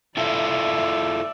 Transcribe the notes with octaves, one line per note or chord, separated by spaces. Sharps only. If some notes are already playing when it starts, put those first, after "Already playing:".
E4 F4 A4 D5 E5